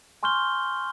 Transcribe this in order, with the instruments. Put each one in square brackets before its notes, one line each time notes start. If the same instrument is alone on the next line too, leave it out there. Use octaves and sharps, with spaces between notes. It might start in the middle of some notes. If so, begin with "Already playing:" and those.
[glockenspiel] G#5 C6 C#6 F6 G6 G7